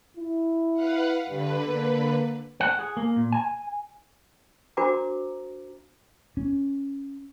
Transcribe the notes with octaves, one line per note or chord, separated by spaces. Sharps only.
E4
B4 F5 F#5
G2 D3 B4
A#3
F#5
G#4
A#3
A#2
G#5
D4 F#4 A#4 C5 A#5 D6
C#4